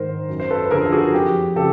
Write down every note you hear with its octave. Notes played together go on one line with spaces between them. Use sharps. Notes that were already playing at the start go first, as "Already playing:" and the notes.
Already playing: G#2 D#3 A#4 C5
F#2
C5
A4 B4
B4
D3 F3 G#4 A#4
A4
F#4 G#4
F2 G4
C#3 F3 G4 A4